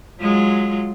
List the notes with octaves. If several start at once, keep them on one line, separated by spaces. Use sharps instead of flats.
F#3 G#3 F4